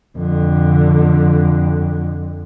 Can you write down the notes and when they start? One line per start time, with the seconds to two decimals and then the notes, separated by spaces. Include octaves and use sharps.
0.18 F2 D3